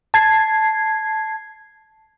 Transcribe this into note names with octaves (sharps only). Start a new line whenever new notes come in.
A5 G#6 C7